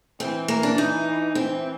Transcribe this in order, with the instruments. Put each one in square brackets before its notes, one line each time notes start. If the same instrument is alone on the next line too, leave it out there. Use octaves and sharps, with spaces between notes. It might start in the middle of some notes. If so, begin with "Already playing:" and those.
[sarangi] E3 [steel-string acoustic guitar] C4
[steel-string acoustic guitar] A#3
D4
D#4
[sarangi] E3 [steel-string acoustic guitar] C4